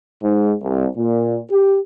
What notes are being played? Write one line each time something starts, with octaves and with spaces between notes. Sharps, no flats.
G#2
C2
A#2
G4